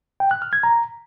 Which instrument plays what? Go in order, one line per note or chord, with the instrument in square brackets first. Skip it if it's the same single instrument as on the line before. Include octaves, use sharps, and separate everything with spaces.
[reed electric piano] G5
F#6
F6
G#6
A#5